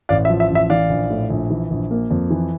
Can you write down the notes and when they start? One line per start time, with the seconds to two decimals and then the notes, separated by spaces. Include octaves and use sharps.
0.09 A1 D5 F5
0.25 E5
0.30 F3
0.40 E5
0.50 A1
0.55 E5
0.70 E3 D5 F5
0.90 A#1
1.10 A2
1.30 A#1
1.50 E3
1.71 A#1
1.91 A#3
2.11 F2
2.30 E3